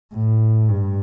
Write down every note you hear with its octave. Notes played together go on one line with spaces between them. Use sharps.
A2
G2